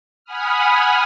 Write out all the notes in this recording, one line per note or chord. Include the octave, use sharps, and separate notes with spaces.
F#5 G#5 B5 D#6 F6